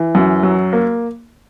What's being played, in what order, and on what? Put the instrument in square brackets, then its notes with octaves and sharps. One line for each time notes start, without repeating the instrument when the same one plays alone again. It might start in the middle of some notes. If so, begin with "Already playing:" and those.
Already playing: [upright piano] E3
F#2
F#3
A#3